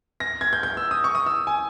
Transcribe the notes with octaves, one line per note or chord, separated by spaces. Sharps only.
A#6
G#6
G6
G6
E6
D#6
C#6
D#6
E6
G#5